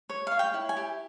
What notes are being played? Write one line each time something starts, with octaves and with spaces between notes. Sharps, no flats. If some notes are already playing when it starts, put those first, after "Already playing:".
C#5
C#5 F5
G5
E4
G#5
G4